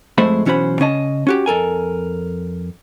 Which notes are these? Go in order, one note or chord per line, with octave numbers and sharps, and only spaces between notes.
F2 G#3 A3 C5 E5 B5
B1 E3 C#4 F#4 C5 B5
C#3 C#4 D#5 A5
C#4 F#4 G4
F2 A4 A#4 G#5